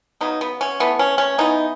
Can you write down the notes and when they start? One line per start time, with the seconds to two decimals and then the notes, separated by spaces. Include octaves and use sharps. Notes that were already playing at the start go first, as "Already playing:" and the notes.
0.21 C#3 F#3 B3 D#4
0.41 B3
0.61 C#4
0.80 E3 A3 B3
0.99 C#4
1.18 C#4
1.38 E3 B3 D#4